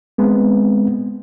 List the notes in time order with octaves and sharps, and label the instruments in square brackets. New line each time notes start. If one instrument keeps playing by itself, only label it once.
[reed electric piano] G#3 B3 C4